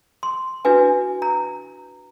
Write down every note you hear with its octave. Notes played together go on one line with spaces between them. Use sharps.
C6
D4 E4 F#4 B4 G#5
A#5